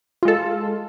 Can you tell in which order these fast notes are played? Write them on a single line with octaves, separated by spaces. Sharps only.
F4 G#3 A4